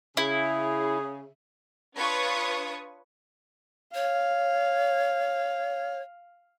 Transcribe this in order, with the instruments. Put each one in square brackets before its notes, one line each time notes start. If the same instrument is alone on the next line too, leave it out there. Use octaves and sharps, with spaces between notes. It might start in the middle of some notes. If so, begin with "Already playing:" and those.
[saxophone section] C#3 [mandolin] E4 [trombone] G#4
[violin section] D4 F4 B4 C#5 C#6 D#6
[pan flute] C#5 [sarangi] F5